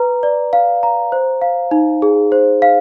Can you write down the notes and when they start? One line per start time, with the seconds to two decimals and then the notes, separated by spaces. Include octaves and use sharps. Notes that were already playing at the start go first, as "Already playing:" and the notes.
Already playing: B4 A#5
0.23 D5
0.53 F5
0.83 A#5
1.12 C5
1.42 F5
1.71 D#4
2.02 G#4
2.32 C5
2.62 F5